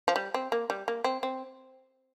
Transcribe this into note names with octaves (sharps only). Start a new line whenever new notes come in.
F3
G3
C4
A#3
G3
A#3
C4
C4